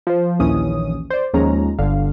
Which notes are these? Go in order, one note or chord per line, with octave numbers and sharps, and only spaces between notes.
F3 C5
A#1 D#2 E3 C#4 D#6
C5 D5
D#2 F3 G#3 C#4 A#5
G1 D3 F5